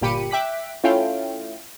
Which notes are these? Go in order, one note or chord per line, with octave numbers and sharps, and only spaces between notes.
G1 A#2 G4 B5 C#7 D#7
E5 G5 D6 F#6 B6
A3 C#4 E4 F4 F5 G5